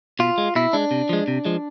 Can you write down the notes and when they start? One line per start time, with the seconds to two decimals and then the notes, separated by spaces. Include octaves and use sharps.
0.19 B2 F4
0.38 G#3
0.55 B2 E4
0.73 G#3 D4
0.91 C3
1.09 F3 G#3
1.28 C3
1.45 F3 G#3